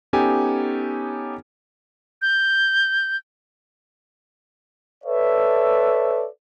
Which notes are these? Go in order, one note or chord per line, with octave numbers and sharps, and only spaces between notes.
B3 C#4 D#4 G4 A4 G#5
G6
A4 B4 C#5 D5 E5